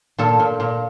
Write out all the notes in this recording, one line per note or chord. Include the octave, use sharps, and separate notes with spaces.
A#2 A4
A#2
A#2